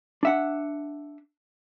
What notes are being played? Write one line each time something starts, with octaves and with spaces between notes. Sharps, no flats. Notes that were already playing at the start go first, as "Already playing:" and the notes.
D4 E5 F#5